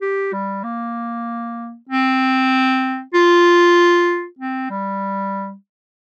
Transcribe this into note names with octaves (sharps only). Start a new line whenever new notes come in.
G4
G3
A#3
C4
F4
C4
G3